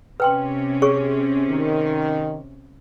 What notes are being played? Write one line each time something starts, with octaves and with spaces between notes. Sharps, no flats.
C3 C#4 B4 G5 C6
G#4 C#5 C#6
D#3